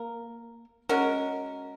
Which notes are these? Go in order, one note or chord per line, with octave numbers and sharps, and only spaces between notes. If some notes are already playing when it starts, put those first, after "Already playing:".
Already playing: A#3 A#4
G#3 C#4 F#4 A#4